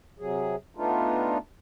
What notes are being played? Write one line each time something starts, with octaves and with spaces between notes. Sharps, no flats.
C3 F#3 G#4
A3 B3 D4 D#4 F4